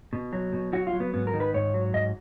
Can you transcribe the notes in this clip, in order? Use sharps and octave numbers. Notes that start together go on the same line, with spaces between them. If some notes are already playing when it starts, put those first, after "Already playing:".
B2
F#3
B2
F#3 F#4
F4
F#3
B3
G#2 B3
A#4
D#3
B4
G#2 C#5
F#3
G#2 D#5